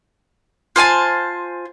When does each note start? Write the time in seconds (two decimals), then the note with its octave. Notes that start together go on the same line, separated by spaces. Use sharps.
0.76 F4 C5 G#5 A5